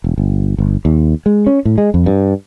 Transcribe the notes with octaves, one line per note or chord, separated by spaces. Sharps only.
E1
G1
G1
D#2
G#3
C#4
A2
G#3
F2
G2